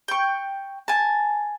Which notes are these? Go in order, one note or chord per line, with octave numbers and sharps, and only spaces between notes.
G5 C#6
G#5 A5